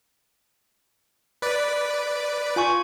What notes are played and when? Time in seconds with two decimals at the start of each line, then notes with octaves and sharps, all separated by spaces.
1.42 B4 D5
2.56 F4 G#5 C#6